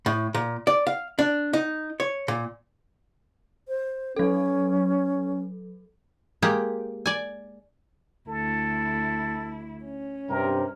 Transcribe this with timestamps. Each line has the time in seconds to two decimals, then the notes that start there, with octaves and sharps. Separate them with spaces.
0.06 A2
0.34 A#2
0.67 D5
0.87 F5
1.19 D4
1.53 D#4
2.00 C#5
2.28 A#2
3.68 C5
4.16 F#3 C#4 A4
6.42 G#3 A#3 G4
7.06 D5 G#5
8.28 D2 E4 A4
9.85 C#4
10.29 G2 C3 A#4